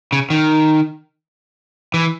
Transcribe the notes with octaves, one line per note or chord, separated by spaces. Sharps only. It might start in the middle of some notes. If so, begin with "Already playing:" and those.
C#3
D#3
E3